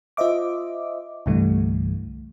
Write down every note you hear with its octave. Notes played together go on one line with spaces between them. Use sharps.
F4 C5 D#5 E5 D6
C2 G2 D3 E3 G3 A3